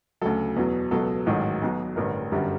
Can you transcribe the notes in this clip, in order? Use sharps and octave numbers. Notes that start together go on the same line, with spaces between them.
D2 C#3 F#3 A4
E2 B2 F#3
C#2 B2 F#3 A4
A1 G#2 D#3 F#3
B1 B2 F#3
A1 G2 D3 A#4
G1 F#2 D3 G3